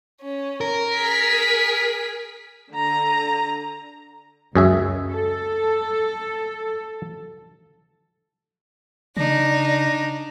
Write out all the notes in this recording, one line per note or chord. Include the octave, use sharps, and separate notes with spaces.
C#4
A#4
G#4 B6
D3 A#5
C#2 F#2 G#4 E5
A4
C#3 D4 D#4 D5 A#6